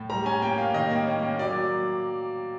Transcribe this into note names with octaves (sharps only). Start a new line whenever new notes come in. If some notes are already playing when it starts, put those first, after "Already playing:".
Already playing: A2
G3 A#5
C#4 G#5
A#3 G5
A#3 F5
D#3 D#5
A#3
C#4
A#3
F#3 D5
F#3